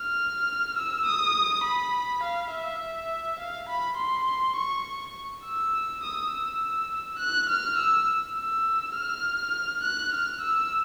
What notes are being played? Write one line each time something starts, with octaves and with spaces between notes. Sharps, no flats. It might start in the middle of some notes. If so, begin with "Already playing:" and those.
Already playing: F6
E6
D#6
B5
F5
E5
F5
B5
C6
C#6
E6
D#6
E6
F#6
F6
E6
E6
F6
F#6
F6
E6